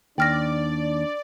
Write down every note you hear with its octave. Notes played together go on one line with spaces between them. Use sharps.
D#2 D4 D5 G5 F6 A#6